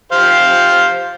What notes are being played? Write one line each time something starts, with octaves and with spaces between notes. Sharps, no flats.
G4 C5 F5